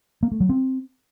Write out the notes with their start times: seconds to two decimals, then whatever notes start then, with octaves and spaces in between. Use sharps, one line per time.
0.23 A#3
0.32 A3
0.40 F#3
0.49 C4